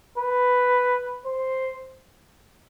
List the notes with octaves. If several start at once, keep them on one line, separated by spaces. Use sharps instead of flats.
B4
C5